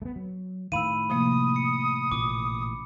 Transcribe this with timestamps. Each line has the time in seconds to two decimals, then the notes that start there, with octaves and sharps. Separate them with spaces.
0.02 A3 B3
0.16 F#3
0.72 A2 D#3 F5 B5 E6 D#7
1.10 C3 F3 A#3 D#6
1.56 C#7
2.12 A1 A#2 D6